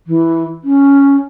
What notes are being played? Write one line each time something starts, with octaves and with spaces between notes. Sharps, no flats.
E3
C#4